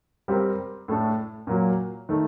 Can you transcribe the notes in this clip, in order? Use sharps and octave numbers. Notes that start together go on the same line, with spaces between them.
G3 C4 G4 A#4
A2 A3 D4 A4
A#2 F#3 A#3
D#3 A3